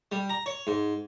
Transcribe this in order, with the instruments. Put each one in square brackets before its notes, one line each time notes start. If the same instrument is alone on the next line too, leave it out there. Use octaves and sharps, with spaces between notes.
[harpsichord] G3
A#5
C#5
G#2